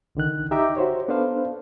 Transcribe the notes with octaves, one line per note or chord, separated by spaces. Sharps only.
C2 D3 D#3 F#6
D#4 G4 E5 G5 A#5 D6
F#4 C5 C#5
B3 D4 A4 B4 C5 F5